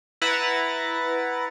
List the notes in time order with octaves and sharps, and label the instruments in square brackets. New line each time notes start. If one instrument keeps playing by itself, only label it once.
[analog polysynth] E4 B4 F#5 A#5 A6